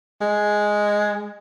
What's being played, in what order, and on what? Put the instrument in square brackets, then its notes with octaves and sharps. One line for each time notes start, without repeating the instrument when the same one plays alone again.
[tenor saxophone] G#3